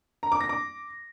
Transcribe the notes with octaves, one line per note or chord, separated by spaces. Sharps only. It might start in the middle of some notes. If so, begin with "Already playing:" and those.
A#5
D6
A#6
D6